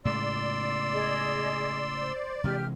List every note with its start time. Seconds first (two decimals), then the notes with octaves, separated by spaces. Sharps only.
0.05 A2 C#3 G#3 D5 C6 E6
0.93 G#4 D#5
1.95 C5
2.44 C3 E3 G#3 G4 F6